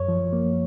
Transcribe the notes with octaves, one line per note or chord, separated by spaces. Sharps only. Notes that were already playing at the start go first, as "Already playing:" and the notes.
Already playing: F#2 C#5
F3
A#3